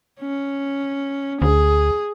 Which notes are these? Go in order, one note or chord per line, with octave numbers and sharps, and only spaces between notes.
C#4
D2 G#4